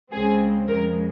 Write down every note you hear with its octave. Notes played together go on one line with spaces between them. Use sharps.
C#2 C#3 G#3 C4 G#4
F2 C#3 G#3 A#4